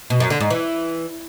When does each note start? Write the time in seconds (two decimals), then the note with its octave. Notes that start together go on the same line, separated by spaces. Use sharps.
0.10 B2
0.20 F#2
0.30 D3
0.40 G#2
0.50 E3